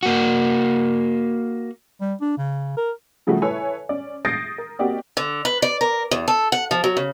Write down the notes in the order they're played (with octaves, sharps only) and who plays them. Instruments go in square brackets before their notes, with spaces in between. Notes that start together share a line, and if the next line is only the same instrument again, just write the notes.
[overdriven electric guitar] A#3 F#4
[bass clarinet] G3
D4
C#3
A#4
[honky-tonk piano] C#3 F3 G3 A3 F#4
E4 A4 B4 C#5 E5 G#5
C#4 D5
D#6 G6 A6 A#6 C7 D7
A#4
A#3 C4 F#4 G4 D5 D#5
[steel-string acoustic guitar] D3
B4
D5
A#4
E2
A4
F#5
F3
F#3
C#3